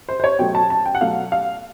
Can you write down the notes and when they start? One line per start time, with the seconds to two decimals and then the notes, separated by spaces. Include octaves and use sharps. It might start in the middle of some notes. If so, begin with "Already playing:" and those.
0.09 C5
0.20 C5
0.24 C#5
0.39 B2 F#3 A3 G5
0.55 A5
0.70 A5
0.86 G5
0.95 F#5
1.01 B2 F#3 A3 F5
1.32 F5